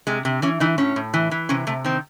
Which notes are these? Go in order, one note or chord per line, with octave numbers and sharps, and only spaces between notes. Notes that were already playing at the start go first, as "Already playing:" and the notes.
C3 G#3
C3
E3 C#4
E3 D#4
A2 C#4
A2
E3
E3
C3 C#4
C3 A3
D#3 C4